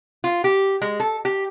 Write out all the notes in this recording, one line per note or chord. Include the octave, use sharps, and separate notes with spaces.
F4
G4
G#3
A4
G4